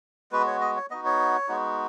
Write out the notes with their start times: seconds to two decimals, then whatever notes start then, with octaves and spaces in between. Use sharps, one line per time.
0.32 G#3 B3 F#4 B4
0.47 C#5
0.61 D#5
0.76 C#5
0.90 B3 D#4 F#4 D#5
1.05 C#5
1.48 G#3 B3 D#4 F#4